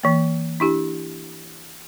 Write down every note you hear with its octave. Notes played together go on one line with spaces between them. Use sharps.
E3 A#3
D4 E4 G4